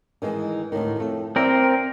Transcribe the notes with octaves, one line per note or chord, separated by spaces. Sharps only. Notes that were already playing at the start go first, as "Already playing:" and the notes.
D#3 E3 G#3
D2 A2 D#3
F2 A3
C4 A#4 D5 E5